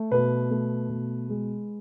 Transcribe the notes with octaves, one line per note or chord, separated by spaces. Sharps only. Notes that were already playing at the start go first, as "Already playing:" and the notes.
Already playing: A3
B2 B4
A3
B2
G#3